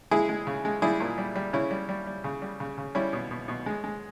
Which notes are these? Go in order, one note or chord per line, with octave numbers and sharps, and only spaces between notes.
G#3 E4 G#4
G#3
C#3
G#3
G3 E4 G#4
A#2
G3
G3
C#3 C#4 E4
G3
G3
G3
C#3
G3
C#3
C#3
G3 C#4 E4
B2
B2
B2
G#3
G#3